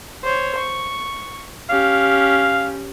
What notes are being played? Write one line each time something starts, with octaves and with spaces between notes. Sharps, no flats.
C5 C#5
C#6
C#4 G4 F5